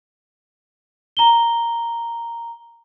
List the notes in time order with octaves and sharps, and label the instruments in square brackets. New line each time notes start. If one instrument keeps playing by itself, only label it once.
[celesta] A#5 G7